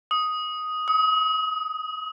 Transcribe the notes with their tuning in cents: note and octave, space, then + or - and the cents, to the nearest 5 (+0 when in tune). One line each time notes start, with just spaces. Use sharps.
D#6 +5
D#6 +35